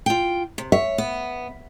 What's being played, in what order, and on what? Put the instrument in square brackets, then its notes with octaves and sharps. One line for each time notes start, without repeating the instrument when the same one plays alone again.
[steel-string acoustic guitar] F4 G5
C3
[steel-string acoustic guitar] C#5 [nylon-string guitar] E5
[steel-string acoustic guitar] B3